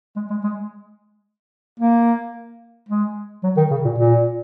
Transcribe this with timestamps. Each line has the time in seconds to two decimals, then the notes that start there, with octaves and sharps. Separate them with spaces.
0.16 G#3
0.30 G#3
0.44 G#3
1.80 A#3
2.89 G#3
3.43 F#3
3.57 D#3
3.71 C#3
3.85 A#2
3.98 A#2